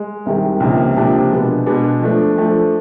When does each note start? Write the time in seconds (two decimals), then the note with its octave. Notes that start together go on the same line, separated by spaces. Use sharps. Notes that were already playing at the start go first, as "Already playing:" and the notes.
Already playing: G#3
0.26 C2 C3 D#3 G#3
0.60 C#2 C3 F3 A#3 D4
0.96 C#2 C3 F3 A#3 D4
1.31 B2 G#3 B3 D4
1.66 B2 G#3 B3 D4
2.01 F3 A3 D4
2.36 F3 A3 D4